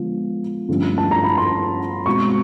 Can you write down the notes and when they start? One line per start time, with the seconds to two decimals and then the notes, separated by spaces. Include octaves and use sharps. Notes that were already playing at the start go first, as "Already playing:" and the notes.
Already playing: D3 F3 G#3 B3
0.68 G2 D3 F3 A3 C#4
0.98 A5
1.11 A#5
1.24 B5
1.38 C6
2.06 B2 G#3 C4 C#6